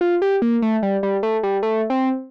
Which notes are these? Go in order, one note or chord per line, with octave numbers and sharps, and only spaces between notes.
F4
G4
A#3
A3
G3
G3
A3
G3
A3
C4